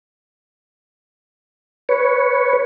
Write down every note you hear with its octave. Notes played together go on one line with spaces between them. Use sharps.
B4 C#5